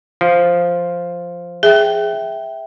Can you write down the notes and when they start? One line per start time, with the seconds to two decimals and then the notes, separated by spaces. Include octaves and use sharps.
0.21 F3
1.63 G#4 E5 G5